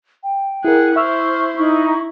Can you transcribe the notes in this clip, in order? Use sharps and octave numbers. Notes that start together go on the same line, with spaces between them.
G5
E4 G#4 A#4 F#5
E4 C5 E5 C#6 E6 F6
D#4 E4 C#6